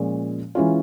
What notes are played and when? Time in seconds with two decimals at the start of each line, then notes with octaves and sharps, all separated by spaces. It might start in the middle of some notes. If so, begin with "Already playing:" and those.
Already playing: A#2 F3 G#3 C#4
0.55 E3 G#3 C#4 F4